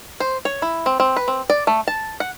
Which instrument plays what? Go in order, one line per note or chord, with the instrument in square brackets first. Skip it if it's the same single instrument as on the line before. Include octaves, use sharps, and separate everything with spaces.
[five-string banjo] C5
C#5
E4
C4
C4
B4
C4
D5
A3
A5
F#5